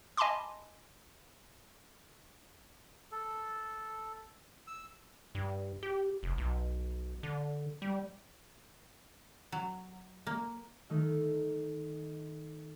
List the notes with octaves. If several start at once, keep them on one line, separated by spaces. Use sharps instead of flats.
D#5 G#5 A5 B5 C6 D6
A4
E6
G2
G4
F1
B1
D3
G3
F#3
A#3
D#3 A3 D#4